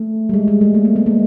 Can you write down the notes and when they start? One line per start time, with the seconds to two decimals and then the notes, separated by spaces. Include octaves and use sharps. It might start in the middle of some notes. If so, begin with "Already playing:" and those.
Already playing: A3
0.29 G3
0.34 G#3
0.48 G#3
0.61 A3
0.74 G#3 A#3
0.85 A3 B3
0.95 A3 B3
1.06 G#3 A#3